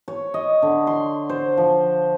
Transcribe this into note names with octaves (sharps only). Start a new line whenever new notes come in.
C#5
D#5
D3
C6
C5
F3